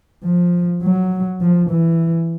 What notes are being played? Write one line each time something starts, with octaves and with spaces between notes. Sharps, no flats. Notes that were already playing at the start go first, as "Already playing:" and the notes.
F3
F#3
F3
E3